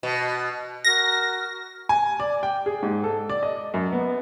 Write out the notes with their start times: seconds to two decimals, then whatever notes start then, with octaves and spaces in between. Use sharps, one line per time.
0.03 B2
0.85 F#4 A#4 F6 A#6
1.89 G#5
2.20 D5
2.43 G5
2.66 G#4
2.83 G#2
3.04 A4
3.29 D5
3.43 D#5
3.74 F#2
3.92 B3